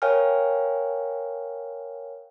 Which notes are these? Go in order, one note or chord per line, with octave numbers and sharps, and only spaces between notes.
A#4 C#5 F5 G5 G#5 F6